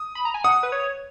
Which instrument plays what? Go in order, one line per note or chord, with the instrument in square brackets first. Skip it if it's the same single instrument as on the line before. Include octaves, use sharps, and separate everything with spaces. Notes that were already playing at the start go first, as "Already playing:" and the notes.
Already playing: [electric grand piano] D#6
[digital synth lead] B5
A#5
G#5
[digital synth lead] F#5 [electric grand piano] D#6
[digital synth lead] B4
C#5